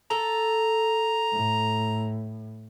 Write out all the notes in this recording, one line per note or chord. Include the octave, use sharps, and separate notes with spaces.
A4 A#5
A2